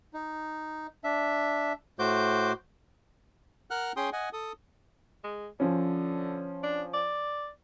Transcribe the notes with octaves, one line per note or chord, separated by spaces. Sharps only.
D#4
D4 E5
A2 A3 F#4 C5 D6 G6
A#4 F#5 F6 F#6
C#4 G#4 G5 C6 D#6
D#5 F#5 G#5
A4 D#6
G#3
D3 F3 C#4
D4
D5